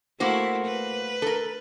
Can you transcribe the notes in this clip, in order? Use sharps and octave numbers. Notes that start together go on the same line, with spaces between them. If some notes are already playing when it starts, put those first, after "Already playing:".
A3 A#3 E4 F#4 C5
B4
A4 A#4